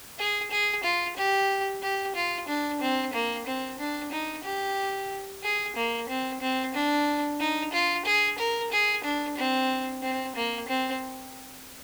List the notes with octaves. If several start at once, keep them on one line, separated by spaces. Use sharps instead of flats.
G#4
G#4
F4
G4
G4
F4
D4
C4
A#3
C4
D4
D#4
G4
G#4
A#3
C4
C4
D4
D#4
F4
G#4
A#4
G#4
D4
C4
C4
A#3
C4